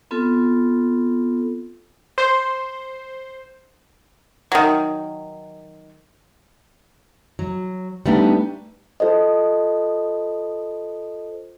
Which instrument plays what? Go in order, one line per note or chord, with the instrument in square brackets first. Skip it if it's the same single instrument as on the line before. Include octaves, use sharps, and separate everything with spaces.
[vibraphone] B3 C4 F4 A4
[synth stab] C5
[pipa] D#3 F#3
[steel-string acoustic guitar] F#3
G3 A3 B3 D4 D#4
[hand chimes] F4 A4 C5 D#5